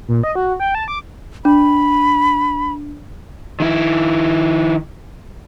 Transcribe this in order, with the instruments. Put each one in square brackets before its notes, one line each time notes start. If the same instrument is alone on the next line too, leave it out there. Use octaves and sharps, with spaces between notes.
[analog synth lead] A#2
D#5
F#4
G5
A5
D6
[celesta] D4 [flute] B5
[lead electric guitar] D#3 E4